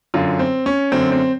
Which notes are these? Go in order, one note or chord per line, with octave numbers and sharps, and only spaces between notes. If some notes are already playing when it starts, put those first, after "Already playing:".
F#2 D3 F4
C4
C#4
F#2 D3 C4
C4